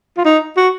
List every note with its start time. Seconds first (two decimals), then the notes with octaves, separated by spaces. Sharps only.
0.17 F4
0.25 D#4
0.57 F#4